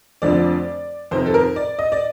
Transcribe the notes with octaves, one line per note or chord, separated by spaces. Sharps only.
F1 F2 D3 F3 D5
F2 C3 D#3 C5
A4
A#4
D5
D#5
D5